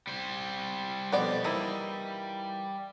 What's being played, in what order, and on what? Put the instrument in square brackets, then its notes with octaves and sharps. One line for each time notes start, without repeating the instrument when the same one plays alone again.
[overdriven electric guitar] G3 C5
[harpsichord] F2 B2 [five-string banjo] B3 D5
[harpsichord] E3 [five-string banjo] A#3 D#4 E4